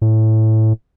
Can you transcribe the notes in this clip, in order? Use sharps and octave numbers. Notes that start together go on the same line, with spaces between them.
A2